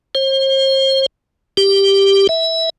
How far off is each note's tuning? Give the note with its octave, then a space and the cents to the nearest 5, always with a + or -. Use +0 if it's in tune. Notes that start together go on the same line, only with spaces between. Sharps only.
C5 +40
G4 +5
E5 -15